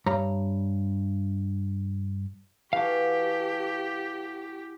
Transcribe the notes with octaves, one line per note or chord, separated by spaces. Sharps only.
G2 C#5 A#5 B5
E3 F#4 G4 A4 F5